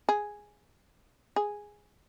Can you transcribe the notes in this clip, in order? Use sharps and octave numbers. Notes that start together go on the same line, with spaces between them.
G#4
G#4